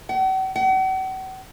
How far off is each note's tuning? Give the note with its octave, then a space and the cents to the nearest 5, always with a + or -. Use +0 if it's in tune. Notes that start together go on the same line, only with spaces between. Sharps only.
F#5 +45
F#5 +40